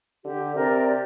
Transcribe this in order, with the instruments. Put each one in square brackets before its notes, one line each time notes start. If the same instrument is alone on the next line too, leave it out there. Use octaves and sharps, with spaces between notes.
[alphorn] D3 [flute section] G4
[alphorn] C3 [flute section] A#4 D5
[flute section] G4